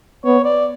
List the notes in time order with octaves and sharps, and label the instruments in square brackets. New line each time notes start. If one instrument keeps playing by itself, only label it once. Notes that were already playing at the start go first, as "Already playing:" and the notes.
[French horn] B3 [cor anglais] C#5
[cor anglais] D5